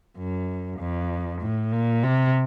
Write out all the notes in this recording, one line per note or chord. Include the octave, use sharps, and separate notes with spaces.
F#2
F2
A2
A#2
C3